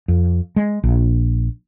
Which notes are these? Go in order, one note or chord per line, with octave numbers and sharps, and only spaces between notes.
F2
G#3
A#1